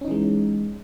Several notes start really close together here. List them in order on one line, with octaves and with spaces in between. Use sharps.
C#4 D#4 E3 G#3